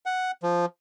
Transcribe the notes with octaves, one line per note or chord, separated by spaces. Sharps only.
F#5
F3